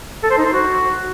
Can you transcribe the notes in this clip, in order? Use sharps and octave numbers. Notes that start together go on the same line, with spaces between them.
A4
C5
D#4
C5
F#4